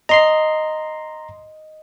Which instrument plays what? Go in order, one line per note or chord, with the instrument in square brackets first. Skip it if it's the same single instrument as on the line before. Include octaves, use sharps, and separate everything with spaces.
[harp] D#5 [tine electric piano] A#5 C6 C7